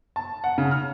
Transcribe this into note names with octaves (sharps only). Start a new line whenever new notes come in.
A5
F#5
C#3
F6